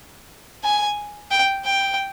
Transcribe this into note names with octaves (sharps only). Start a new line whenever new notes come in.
G#5
G5
G5